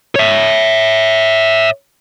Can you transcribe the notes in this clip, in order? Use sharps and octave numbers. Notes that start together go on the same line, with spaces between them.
C#5 E5